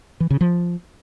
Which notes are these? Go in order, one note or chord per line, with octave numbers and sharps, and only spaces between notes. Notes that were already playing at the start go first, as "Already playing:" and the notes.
E3
C#3
F3